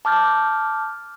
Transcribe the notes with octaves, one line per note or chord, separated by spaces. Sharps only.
A5 D6 F6 G6 A6